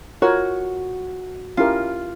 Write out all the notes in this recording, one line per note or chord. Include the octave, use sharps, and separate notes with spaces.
F4 F#4 A#4 C#5
C#4 E4 F4 G4 A#4